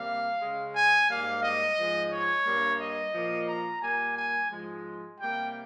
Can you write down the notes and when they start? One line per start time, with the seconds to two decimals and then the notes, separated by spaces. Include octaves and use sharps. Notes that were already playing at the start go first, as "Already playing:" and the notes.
Already playing: C3 G3 A#3 F5
0.41 C#3 G#3
0.75 G#5
1.09 G#2 G3 A#3 F5
1.43 D#5
1.77 G#2 F3 G#3
2.12 C#5
2.46 G2 G3 A#3
2.80 D#5
3.14 A#2 F3 A#3
3.48 A#5
3.82 A#2 G3 A#3 G#5
4.16 G#5
4.50 G#2 F3 G#3
5.19 C3 G3 A#3 G5